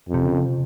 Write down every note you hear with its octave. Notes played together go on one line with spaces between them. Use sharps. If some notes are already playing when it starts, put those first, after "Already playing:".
F2
C3
C#3
C3